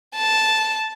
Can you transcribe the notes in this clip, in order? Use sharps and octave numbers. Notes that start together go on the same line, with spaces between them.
A5